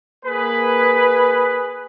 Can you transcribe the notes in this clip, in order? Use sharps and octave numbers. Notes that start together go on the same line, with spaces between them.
A#3 G#4 B4